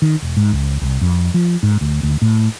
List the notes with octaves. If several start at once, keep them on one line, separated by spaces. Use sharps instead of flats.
D#3
E1
G#2
C#2
C2
F2
F3
G#2
D2
D2
A2